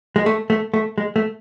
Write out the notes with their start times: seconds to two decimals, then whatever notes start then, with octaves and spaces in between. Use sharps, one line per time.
0.16 G#3
0.26 A3
0.50 A3
0.74 A3
0.98 G#3
1.16 A3